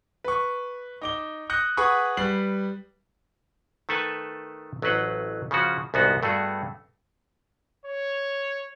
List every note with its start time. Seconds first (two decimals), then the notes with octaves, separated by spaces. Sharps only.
0.24 B4 C#6
1.01 D#4 D6 G7
1.50 D#6 F#6 G6 A#6 C#7
1.77 G#4 B4 F#5 B5 C#6 D#6
2.17 G3 B4 C7 F#7
3.89 D#3 A3 A4 B4 G#5 A5
4.82 A1 F#3 A3 B4 C5 F#5
5.51 C#3 F3 C#4 F#4
5.94 C2 G#2 B3 D#4 F#4
6.23 G2 A3 B3 F#4 G#4
7.86 C#5